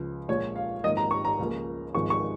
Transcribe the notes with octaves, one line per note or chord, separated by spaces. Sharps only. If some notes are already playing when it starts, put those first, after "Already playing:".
Already playing: C#2 C#3 F3
A#1 A#2 F3 G#3 C#5
F5
G#1 G#2 F3 A#3 D#5
A#5
C#6
A#5
C#2 C#3 F3 A#3
G#1 G#2 F3 G#3 C#6
C#6